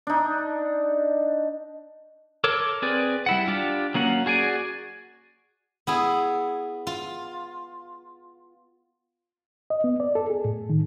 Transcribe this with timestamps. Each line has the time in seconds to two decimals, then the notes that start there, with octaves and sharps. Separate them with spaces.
0.07 D4 D#4
2.44 A4 A#4 C#5 D6
2.82 C4 G#4 B4 D5
3.26 G3 E4 F#5
3.48 D4 F4 G4
3.94 F#3 A#3 C#4 F#5
4.26 F#4 G#4 D5 G#5
5.87 B3 E4 G#4
6.87 F4
9.70 D#5
9.84 B3
10.00 D5
10.15 A4
10.30 G#4
10.45 A2
10.70 D#3